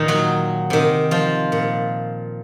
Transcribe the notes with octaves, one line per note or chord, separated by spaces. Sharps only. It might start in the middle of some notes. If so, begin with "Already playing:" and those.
Already playing: A#2 D#3 D#4
F#3 F#4
C3 D#3
F3 F4
A#2